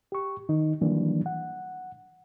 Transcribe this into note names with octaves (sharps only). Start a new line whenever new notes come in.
G4 C#6
D#3 D#4
D#3 E3 F#3 G3 A#3 D4
F#5